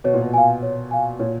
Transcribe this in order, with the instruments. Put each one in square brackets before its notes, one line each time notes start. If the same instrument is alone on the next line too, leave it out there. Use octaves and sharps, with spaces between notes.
[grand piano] B2 [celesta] C#5
[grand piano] A#2
B2
[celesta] F5 G#5
C#5
F5 G#5
[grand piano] A#2 [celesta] C#5